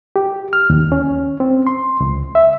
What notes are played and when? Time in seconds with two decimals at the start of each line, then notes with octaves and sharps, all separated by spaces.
0.16 G4
0.53 F6
0.70 D#2
0.92 C#4
1.40 C4
1.67 C6
2.00 C#2
2.35 E5